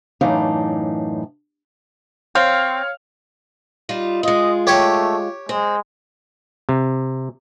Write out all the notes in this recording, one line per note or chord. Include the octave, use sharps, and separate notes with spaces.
F#2 A2 E3 D4 D#4 F5
C4 C#5 F5 F6
G3 D#4 F4
G#3 F4 D#5
A3 G4 C#5
G#3 C4
C3